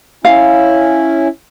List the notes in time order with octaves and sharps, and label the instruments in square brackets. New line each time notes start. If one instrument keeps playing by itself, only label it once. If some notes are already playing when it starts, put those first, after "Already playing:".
[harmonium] C#4 E4 [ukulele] F5